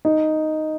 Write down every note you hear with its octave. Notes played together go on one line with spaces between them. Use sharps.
D#4